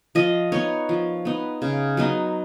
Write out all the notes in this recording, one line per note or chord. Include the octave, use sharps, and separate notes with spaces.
F3 D#5
B3 D#4 C#5
F3
B3 D#4
C#3
F#3 B3 D#4